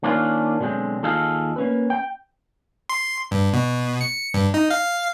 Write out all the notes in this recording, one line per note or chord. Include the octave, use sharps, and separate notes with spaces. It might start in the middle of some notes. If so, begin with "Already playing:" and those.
D#3 A#3 C#4 D4 F4
B2 D3 F#3 G#3 C4
D#2 F4 G#4 A4 D#5 F5
A#3 C#4 B4
G5
C6
G2
B2
C#7
G2
D#4
F5